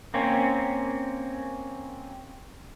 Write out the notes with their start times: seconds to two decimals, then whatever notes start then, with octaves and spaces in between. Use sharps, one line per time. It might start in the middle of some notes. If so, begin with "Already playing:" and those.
0.14 A#3 C4 C#4